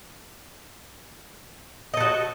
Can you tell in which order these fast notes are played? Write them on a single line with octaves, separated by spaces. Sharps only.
D#5 A4 F#4